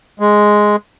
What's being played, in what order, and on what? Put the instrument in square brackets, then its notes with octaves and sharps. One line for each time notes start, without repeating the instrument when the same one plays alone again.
[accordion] G#3